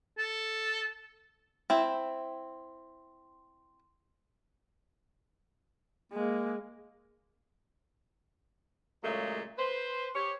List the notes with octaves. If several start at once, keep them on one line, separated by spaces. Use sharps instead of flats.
A4
C4 E4
G#3 A#3
A#2 C#3 F#3 G#3 A3
B4 C5
G4 C#5